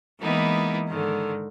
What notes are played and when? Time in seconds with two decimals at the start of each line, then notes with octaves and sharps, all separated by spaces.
0.20 E3 G#3 A#3 B3 D#4 E4
0.88 G#2 D3 D#3